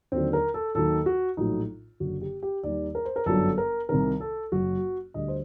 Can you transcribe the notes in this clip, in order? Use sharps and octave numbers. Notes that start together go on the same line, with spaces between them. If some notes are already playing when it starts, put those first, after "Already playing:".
D#2 D3 F#3 C4
A#4
A4
D#2 D#3 F#3 A4
F#4
A#1 A2 F#3 D#4
F#1 F#2 D3 F#4
G4
G4
D#2 D#3 G3 D5
A#4
C5
A#4
G1 F#2 D3 F#3 A4
A#4
C2 C3 D#3 A#4
A4
F#1 F#2 F#3 F#4
D2 D3 G3 D#5
C5